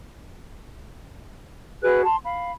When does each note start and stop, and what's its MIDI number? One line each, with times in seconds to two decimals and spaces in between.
1.82 2.03 66
1.82 2.03 68
1.82 2.03 71
1.82 2.03 90
2.04 2.17 81
2.04 2.17 84
2.24 2.52 77
2.24 2.52 83